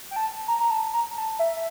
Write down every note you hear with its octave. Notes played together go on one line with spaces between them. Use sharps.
G5
A5
A#5
A#5
A5
A#5
A5
E5